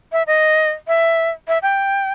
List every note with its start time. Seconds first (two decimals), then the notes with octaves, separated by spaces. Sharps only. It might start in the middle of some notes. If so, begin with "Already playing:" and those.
0.12 E5
0.27 D#5
0.87 E5
1.48 E5
1.62 G5